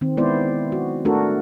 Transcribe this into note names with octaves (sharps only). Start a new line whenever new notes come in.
D#3 C4
G#3 B3 E4 C5 D5
F#4
A3 D4 F#4 A4 A#4